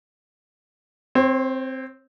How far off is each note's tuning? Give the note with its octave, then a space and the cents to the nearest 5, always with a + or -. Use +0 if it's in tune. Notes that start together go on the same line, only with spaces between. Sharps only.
C4 +0 C#5 -40